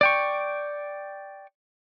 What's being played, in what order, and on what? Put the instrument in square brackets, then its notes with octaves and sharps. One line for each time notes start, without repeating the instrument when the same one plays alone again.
[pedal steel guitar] D5 G5 C#6